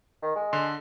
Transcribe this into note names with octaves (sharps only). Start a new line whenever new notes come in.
D#3
G#3
D3 C6